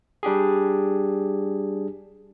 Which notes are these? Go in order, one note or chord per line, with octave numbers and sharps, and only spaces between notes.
G3 D4 G4 G#4